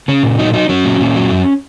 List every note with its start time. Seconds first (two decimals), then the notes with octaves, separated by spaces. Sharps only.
0.08 C#3 C#4
0.23 A#2
0.38 F#3 D#4
0.54 F#3 D#4
0.69 F#3 C#4
0.85 A#2
1.01 A#2
1.16 F#3
1.31 F#2